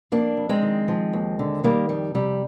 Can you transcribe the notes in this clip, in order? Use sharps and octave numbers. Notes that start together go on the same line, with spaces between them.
F2 A#3 D4
F2
G#3 C4
D#3
F3
D#2
D3
D#3 G3 A#3
F2 G3
C3 G3